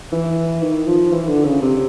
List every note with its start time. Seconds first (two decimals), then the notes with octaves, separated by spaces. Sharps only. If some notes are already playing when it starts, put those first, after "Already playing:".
0.12 E3
0.62 D#3
0.87 F3
1.12 E3
1.29 D3
1.45 C#3
1.62 C3